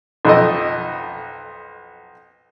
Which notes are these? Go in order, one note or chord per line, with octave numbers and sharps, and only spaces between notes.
B1 F2 A4 D#5